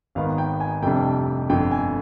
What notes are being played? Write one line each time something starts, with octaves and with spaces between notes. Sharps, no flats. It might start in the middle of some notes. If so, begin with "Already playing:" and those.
G#1 G#2 D#3 B3 F5
G5
G#5
F1 F2 C3 G3 D4 G5
G1 F2 D3 G5
G#5